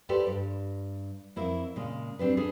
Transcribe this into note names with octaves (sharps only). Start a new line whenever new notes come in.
G4 A4 B4 C5 D5 G5
G2
F2 E4 A#4
A#2 C#3 G#3
G3 C4 D4 B4
D4 G#4 A4 B4